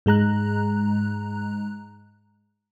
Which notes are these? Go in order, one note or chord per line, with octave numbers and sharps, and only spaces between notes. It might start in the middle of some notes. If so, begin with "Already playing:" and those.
G#2 G#3 A#5 F#6